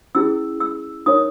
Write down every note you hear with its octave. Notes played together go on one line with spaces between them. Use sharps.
C#4 E4 G#4 E6
E6
D#4 A#4 C#5 D#6